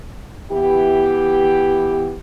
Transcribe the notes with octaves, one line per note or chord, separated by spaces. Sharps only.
E3 B3 E4 G4